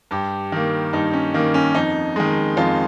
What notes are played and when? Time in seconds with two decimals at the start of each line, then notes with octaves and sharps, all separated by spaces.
0.11 G2 G4
0.52 D#3 A#3
0.93 G2 D#4
1.13 C#4
1.34 D#3 A#3
1.54 C#4
1.75 F2 D#4
2.16 D#3 G#3
2.57 F2 F4